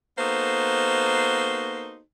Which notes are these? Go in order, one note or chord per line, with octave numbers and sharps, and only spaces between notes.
A#3 B3 D#4 F#4 A4 C5